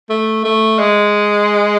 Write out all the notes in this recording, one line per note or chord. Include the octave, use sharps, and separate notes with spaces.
A3
A3
G#3